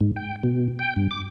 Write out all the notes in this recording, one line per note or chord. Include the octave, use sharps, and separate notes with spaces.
G#2
G5
B2
G5
G2
D6